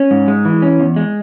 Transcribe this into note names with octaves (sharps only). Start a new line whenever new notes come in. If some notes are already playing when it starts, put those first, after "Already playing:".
Already playing: C#4
G#2
G#3
E3
C#4
E2
G#3